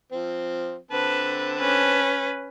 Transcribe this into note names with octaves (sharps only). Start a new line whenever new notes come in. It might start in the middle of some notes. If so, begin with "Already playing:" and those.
F3 C4
D3 C4 B4 A5
C#4 B4